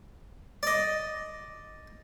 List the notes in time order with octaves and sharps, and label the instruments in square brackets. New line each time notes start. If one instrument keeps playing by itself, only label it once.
[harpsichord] D5 D#5